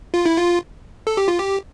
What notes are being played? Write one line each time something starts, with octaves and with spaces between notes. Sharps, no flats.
F4
E4
F4
A4
G4
F4
G4